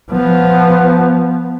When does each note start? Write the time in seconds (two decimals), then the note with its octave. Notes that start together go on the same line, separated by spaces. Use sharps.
0.11 F3 B3